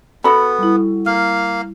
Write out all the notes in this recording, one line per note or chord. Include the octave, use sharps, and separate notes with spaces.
B3 F#4 A4 B5
G3 E4
A#3 F5 F6